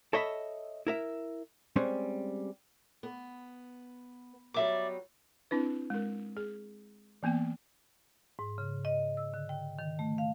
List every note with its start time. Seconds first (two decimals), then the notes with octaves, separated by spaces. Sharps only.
0.13 A4 C#5 D#5 E5 A5 B5
0.87 E4 A#4 E5
1.76 G3 G#3 C4 C#4
3.03 B3
4.54 F#3 G3 B3 D5 E5 D6
5.51 C4 D4 E4 B4
5.90 G#3 A#4
6.37 G#4
7.23 E3 A#3 B3 G5
8.39 G#2
8.58 C#3
8.85 D#5
9.17 E6
9.34 D3
9.49 G5
9.79 D#3
9.99 A3
10.18 F5